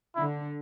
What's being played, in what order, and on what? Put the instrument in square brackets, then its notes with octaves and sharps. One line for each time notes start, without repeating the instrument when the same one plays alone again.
[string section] D3 [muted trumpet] E4